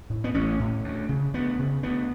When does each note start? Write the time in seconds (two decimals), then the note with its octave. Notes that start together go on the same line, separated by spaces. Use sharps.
0.10 A2
0.24 B3
0.34 A1 C#4
0.59 A2
0.84 D2
1.09 C#3
1.34 D2 B3
1.59 C#3
1.83 D2 B3